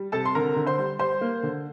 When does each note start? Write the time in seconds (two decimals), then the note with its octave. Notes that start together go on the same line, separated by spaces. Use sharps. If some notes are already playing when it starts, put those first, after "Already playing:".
Already playing: G3
0.12 C3 A4 A5
0.25 C6
0.35 D3 A#4 A#5
0.56 D3
0.67 C5 C6
0.78 G3
0.99 G3 C5 C6
1.21 A#3
1.43 D3